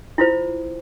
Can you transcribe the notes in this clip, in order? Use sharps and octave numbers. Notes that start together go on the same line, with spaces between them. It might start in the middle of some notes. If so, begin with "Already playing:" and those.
E4 F4 C5